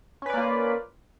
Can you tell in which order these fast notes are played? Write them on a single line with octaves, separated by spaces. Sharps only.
C#4 B4 D5 A#3 F4